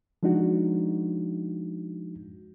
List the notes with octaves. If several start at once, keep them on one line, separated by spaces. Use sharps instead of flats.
F3 G#3 D4 D#4 F#4